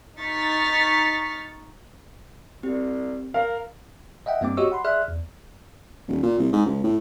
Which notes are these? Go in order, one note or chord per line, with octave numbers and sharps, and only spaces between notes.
D#4 C#6 F6 A6 B6
C2 C4 G4
A#4 F5
D#5 E5 F#5 G5
G2 G3 A#3 C4 D6
F#4 G4 C#5 D#5 C#6 E6
F#5 B5 C6
G#4 D5 E5 C6 F6 F#6
E2
D#1
A#2
C2
G#2
C#2
A2